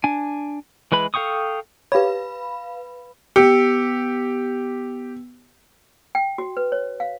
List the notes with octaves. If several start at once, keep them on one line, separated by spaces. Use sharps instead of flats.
D4 G#5
E3 G#3 B4 B5
A4 F5 G5 C#6 D#6
G4 B4 C#5 F5 B5
B3 G4 E6 C#7
G5
F#4
B4
C#5
F5